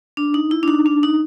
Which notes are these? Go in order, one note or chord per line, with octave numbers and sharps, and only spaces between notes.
D4
D#4
E4
D4
D#4
D4
D#4